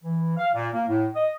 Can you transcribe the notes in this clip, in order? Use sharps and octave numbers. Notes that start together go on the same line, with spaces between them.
E3
F5
A#2
A#3
A2
D#5